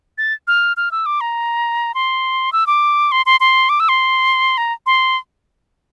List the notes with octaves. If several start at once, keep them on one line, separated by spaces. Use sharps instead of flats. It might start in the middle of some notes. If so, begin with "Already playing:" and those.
A6
F6
F6
E6
D6
A#5
C6
E6
D6
C6
C6
C6
D6
E6
C6
A#5
C6